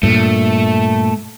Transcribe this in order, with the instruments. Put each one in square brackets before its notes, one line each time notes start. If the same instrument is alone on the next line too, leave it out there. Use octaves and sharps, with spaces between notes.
[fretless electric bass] G2 A#2 [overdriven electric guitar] A3